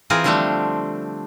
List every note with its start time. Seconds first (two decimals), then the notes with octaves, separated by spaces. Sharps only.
0.10 E3 C4 F4 G#4 A#4
0.24 D3 F3 G3 A3 C4 D4